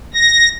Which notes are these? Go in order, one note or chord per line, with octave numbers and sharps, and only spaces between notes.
A#6